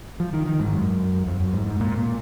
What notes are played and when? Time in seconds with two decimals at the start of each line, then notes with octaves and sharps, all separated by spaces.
0.20 F3
0.33 D#3
0.46 D#3
0.60 G#2
0.73 F#2
1.27 F2
1.40 F#2
1.53 G#2
1.67 G#2
1.80 A#2
1.98 A#2